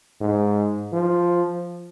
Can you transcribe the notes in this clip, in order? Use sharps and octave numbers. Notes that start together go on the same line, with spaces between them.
G#2
F3